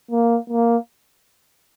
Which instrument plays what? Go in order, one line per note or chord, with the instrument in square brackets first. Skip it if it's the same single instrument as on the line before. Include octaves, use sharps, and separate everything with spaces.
[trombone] A#3
A#3